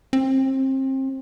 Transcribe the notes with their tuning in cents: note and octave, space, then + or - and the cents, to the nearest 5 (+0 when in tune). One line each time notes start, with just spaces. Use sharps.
C4 +30